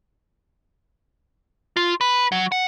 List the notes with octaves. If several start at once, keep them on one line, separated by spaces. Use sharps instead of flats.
F4
B4
F#3
F#5